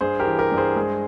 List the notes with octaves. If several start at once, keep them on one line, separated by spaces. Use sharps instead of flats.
G2 G#4 C5
G4 A#4
E3
G4 A#4
G2
G#4 C5
G#3